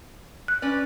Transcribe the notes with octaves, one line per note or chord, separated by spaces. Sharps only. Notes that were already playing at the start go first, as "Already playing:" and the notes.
F#6
C#4 B4 D5